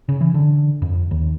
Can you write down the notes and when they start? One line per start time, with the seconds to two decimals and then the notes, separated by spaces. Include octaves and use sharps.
0.09 C#3
0.21 E3
0.34 D3
0.82 F2
1.11 D#2